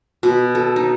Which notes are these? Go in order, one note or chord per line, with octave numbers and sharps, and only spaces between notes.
B2
A4
D#4